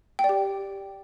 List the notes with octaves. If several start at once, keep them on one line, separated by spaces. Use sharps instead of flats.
G5
D5
G4